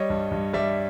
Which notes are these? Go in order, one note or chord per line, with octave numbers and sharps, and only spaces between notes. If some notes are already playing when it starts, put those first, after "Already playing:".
Already playing: G3 C#5 D#5
G2
G2
G3 D5 E5